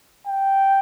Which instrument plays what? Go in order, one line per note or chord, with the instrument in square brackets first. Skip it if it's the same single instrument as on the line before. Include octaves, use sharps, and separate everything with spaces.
[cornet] G5